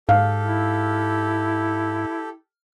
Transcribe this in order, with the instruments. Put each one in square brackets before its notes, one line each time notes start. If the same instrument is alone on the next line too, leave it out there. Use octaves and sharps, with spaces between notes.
[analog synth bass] G#2 [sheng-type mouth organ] G4 A4 [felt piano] F5
[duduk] E4